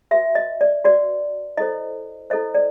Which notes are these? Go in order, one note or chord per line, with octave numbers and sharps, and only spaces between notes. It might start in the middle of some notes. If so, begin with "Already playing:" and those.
F#4 B4 E5
D#5
D5
F#4 B4 D5
E4 A4 C5 D#5
E4 A4 C5 D#5
D5